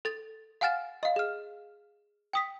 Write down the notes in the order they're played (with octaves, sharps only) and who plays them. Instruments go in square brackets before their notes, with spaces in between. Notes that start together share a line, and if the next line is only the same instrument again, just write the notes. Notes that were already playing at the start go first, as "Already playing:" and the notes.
[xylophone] A4 A6
F5 F#5 G#5 F6 A6 E7
D#5 F5
G#4 F6
G5 D#6 B6